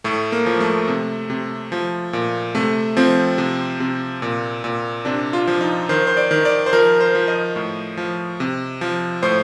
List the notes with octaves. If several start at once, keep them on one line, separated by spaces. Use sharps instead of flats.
A2 A3
A#3
F3
A3
C3
C3
F3
A#2
C3 A3
F3 C4
C3
C3
A#2
A#2
C3 D4
F4
F3
D#4
D#3 C5
C5
D5
D#3
D5
C5
F3 A#4
C5
F3
D#5
A2
F3
C3
F3
A2 C5